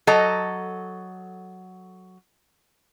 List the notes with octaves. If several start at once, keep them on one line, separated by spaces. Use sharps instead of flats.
F#3 A4 D#5 A#5